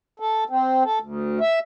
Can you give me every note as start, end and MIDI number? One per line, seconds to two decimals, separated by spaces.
0.20 0.44 69
0.50 0.83 60
0.84 0.99 69
1.00 1.39 38
1.41 1.59 76